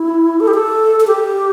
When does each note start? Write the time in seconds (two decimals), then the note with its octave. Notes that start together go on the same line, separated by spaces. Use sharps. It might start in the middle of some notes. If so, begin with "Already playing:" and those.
Already playing: E4
0.40 A4
0.48 G4
0.54 A4
1.00 A4
1.07 G4